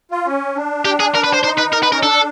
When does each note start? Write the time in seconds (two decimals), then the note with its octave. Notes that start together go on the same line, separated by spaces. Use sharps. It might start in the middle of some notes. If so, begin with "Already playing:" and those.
0.11 F4
0.26 C#4
0.56 D4
0.85 G4
1.00 G#4
1.15 A#4
1.24 B4
1.33 C5
1.43 D#4 C5
1.58 B4
1.72 A#4
1.83 B4
1.90 C#4 A#4
2.02 D4 A4